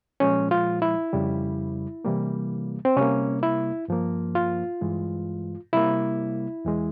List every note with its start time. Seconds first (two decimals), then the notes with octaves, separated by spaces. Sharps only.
0.20 A#2 F3 G#3 C#4
0.51 F4
0.82 E4
1.13 F2 C#3 G3
2.05 C3 E3 G3 A#3
2.85 C4
2.96 C3 G3 A#3 C#4
3.43 E4
3.88 G2 F3 A#3
4.35 F4
4.81 G2 E3 G#3
5.73 C3 G3 A#3 E4
6.65 E2 E3 G#3